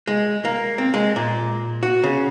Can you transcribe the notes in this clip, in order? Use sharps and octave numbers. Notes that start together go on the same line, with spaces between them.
G#3
A#3
C4
G#3
A#2
F#4
C#3